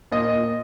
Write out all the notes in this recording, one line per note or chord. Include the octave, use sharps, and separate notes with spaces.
A#2 D#5
A#2